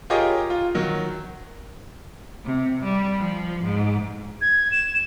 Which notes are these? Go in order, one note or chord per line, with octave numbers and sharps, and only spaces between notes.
F4 G4 G#4 A#4 C#5 D#5
F4
D#3 F#3
C3
G3
F3
G#2
G#6
E7